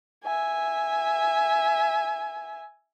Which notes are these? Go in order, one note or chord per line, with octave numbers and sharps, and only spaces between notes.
E5 G#5